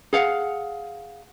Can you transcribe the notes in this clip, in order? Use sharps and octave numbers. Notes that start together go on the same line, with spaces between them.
G#4 F5 F#5